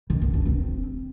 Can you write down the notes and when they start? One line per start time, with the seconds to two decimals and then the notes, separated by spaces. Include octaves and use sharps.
0.10 D#3
0.22 B3
0.34 D4
0.45 C4